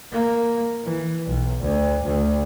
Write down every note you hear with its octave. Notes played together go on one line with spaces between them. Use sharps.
A#3
E3
B1
D2
D2